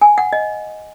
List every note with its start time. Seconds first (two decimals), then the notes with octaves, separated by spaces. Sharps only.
0.02 G#5
0.18 F#5
0.33 D#5